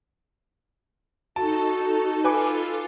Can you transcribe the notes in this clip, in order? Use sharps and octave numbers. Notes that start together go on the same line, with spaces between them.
D#4 F#4 A4 A5
F4 A4 B4 G#5 D6